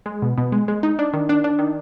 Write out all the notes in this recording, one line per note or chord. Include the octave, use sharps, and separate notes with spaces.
G#3
B2
B2
G#3
G#3
D#4
D4
D#3
D4
D4
D#3